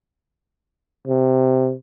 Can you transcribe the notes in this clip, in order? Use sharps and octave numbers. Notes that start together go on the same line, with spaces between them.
C3